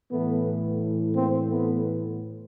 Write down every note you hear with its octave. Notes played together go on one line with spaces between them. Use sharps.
A2 E3 A3 B3
A#3 C4
A3 B3